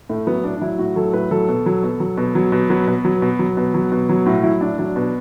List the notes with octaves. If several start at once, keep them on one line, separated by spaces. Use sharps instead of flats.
A2 A3
F#3 B3
A2 D4
D4
F#3 E4
A2 F#4
F#3 A4
A2 B4
F#3 A4
B2
F#3
B2
F#3
B2
F#3
B2
F#3 B4
B2
F#3
B2
F#3
B2
F#3
B2
F#3
A2 F#4
F#3 E4
A2 D4
F#3 D4
B2